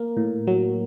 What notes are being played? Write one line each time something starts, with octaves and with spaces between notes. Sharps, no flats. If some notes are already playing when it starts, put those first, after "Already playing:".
Already playing: A#3 A#4
A2
F#3